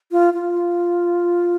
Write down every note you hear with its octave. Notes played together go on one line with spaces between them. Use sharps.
F4
F4